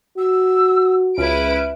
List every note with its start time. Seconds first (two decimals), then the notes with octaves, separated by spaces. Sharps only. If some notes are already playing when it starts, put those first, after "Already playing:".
0.18 F#4 E6
1.18 C#2 E4 B4 F6 D7